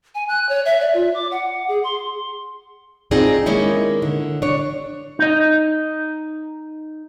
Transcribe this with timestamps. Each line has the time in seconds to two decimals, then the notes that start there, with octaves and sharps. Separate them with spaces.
0.15 G#5
0.28 F#6
0.49 C#5
0.66 E5
0.80 D5
0.94 F4
1.14 D6
1.31 F#5
1.69 G#4
1.84 C6
3.11 C4 D#4 F4 G#4 C5 D5
3.46 D#3 G#3 A#3 C#4 D#4 E4
4.02 D3
4.42 D4 C#5
5.19 D#4 D#5